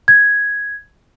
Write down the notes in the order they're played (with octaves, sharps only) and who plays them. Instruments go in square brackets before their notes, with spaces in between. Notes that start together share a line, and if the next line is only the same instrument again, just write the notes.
[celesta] G#6